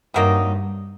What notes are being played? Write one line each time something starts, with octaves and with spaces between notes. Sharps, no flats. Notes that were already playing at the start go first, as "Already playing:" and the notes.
G2 C3 F#3 A#3 D#4